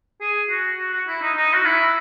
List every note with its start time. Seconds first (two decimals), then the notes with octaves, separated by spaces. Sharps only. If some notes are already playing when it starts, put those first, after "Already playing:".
0.21 G#4
0.50 F#4
0.79 F#4
0.93 F#4
1.08 E4
1.22 D#4
1.37 D#4
1.54 F#4
1.65 E4